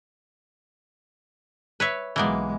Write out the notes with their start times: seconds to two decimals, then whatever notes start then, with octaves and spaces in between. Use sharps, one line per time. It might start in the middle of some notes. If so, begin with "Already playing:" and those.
1.80 B4 C#5 E5
2.16 B1 E3 G#3 A#3 B3